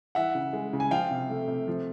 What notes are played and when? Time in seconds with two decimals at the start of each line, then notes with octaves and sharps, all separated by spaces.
0.15 E3 E5 F#5
0.35 C#3
0.53 G#3
0.73 C#3
0.80 G#5
0.91 F3 F5 G5
1.11 C3
1.29 A3
1.48 C3
1.68 F3